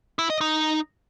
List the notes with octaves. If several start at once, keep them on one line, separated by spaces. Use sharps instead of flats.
E4
D#5
D#4